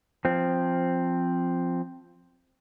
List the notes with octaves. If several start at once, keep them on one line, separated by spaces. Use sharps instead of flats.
F3 C4